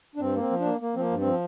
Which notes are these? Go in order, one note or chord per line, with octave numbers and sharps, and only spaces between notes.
D4
G2 C4
A#3
C4
F3
D4
A#3
A#3
F3 C4
A#3
G2
C4
F3